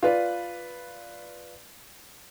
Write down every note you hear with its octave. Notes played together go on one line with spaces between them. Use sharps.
F4 B4 D5